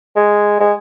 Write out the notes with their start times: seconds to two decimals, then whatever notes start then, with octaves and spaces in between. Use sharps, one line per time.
0.16 G#3
0.60 G#3